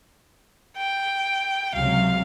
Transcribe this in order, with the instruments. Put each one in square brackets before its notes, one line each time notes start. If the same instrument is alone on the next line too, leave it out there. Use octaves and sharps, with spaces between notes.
[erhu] G5
[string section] C#2 C3 F#3 [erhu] F5